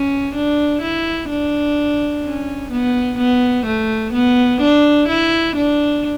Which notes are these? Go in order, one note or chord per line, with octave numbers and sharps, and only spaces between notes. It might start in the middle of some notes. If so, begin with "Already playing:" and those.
Already playing: C#4
D4
E4
D4
C#4
B3
B3
A3
B3
D4
E4
D4